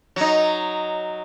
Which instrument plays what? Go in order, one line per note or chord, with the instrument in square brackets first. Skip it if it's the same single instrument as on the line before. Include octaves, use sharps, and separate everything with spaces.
[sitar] F#3 D#4